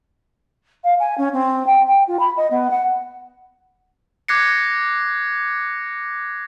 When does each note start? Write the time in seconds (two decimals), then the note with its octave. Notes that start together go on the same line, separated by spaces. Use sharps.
0.84 F5
0.99 G#5
1.18 C#4
1.33 C4
1.66 G5
1.87 G5
2.07 F4
2.19 B5
2.37 D#5
2.50 B3
2.70 F#5
4.28 D6 F#6 G#6 A#6 C7 C#7